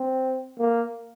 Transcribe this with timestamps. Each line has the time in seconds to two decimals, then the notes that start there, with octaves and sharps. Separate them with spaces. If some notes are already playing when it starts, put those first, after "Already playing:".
Already playing: C4
0.59 A#3